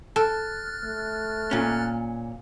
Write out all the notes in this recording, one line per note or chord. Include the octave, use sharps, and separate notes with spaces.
A4 F6 F#6 A6
A3
A#2 C#4